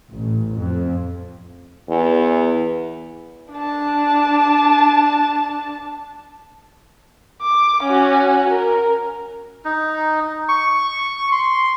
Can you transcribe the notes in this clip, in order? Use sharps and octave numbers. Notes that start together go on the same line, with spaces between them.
A1
F2
E2
D4 A5
D6
C#4 F#4
A#4
D#4
C#6
C6